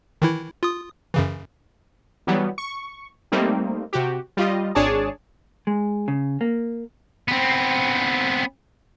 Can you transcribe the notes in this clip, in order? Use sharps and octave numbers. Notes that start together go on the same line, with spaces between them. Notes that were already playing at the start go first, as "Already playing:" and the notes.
D#3 E3 E4
F4 D#6
F#2 C#3 E3
E3 F#3 G3 B3
C#6
G3 A3 A#3 C4 D#4
C3 F#4 G4
G3 F4 D#5
G#1 D4 G#4 C#5 D5 A5
G#3
C#3
A#3
B3 C4